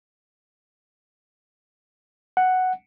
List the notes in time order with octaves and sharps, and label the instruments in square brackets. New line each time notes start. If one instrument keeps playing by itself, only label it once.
[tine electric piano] F#5